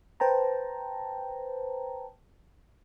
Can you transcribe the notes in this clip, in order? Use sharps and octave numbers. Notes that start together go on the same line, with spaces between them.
B4 C5 G5 A5 A#5